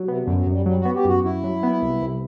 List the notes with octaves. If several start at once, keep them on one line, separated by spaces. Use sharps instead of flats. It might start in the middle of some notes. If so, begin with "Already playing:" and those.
Already playing: F#3
C3 B3
F#2 D3
F#3
F#2
G3
F#3 G3
F#4
B3
G4
F#2 F#4
F#2 E4
F#3
B3
C2
C2